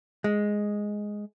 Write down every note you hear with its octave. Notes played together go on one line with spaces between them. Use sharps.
G#3